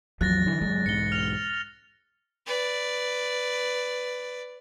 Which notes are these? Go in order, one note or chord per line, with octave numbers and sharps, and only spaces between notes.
A1 E2 F3 F#3 F#6 A6 A#6
D3 E3
G1 C#3 F#3 G#3
B1 E2 G#2 C#7 G7
F6 F7
B4 D5